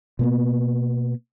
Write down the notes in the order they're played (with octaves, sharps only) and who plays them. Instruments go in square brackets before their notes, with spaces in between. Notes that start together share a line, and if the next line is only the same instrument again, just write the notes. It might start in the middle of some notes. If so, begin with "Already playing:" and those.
[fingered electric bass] B2 A#3 B3